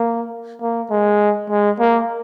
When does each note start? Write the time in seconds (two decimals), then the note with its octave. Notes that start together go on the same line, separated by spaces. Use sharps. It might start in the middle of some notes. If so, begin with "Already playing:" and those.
Already playing: A#3
0.61 A#3
0.90 G#3
1.50 G#3
1.79 A#3